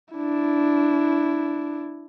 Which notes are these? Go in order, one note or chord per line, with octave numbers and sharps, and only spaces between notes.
D4 E4